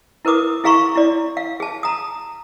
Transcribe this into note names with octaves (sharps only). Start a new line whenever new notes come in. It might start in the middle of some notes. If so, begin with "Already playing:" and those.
E4 A#4 B4 D6 D#6
E4 G#4 F5 A#5 C6 C#6
E4 D5
F5
G#4 A5
A#5 D#6